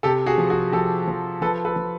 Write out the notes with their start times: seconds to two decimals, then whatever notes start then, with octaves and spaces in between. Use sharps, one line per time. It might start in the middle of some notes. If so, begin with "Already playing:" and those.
0.03 C3 G4 A4
0.26 F#4 G#4
0.38 F3
0.50 F#4 G#4
0.72 F3 G4 A4
1.07 F3
1.42 F3 A4 B4
1.65 A4 B4
1.76 F3